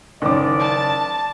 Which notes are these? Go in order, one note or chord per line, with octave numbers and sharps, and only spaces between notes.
F#1 D#3 C#4 D5 D6
A5